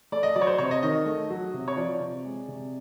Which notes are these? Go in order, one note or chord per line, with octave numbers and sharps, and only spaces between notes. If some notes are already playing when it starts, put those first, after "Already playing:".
A3 D5
D#5
F#3 D5
C#5
C5
C3 C#5
D#5
D#3 D#5
A3
F#3
C3
C#5
F3 D5
C3
G#3
C3